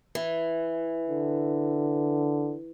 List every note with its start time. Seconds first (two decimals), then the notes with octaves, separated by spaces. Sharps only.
0.15 E3
1.10 D3